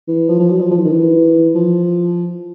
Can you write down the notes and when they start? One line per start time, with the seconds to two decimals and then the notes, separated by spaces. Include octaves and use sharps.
0.08 E3
0.29 F3
0.40 F3
0.50 F#3
0.61 F3
0.71 F3
0.78 E3
0.85 D#3
0.92 E3
1.55 F3